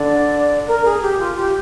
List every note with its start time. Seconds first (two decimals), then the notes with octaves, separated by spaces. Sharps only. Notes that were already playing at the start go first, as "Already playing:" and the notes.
Already playing: D3 D5
0.67 A#4
0.85 G#4
1.02 G4
1.19 F4
1.37 G4